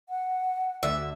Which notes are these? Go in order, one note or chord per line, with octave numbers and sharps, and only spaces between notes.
F#5
D2 D3 E5